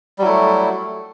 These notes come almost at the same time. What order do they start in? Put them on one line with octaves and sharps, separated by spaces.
G3 F#3 E4 A3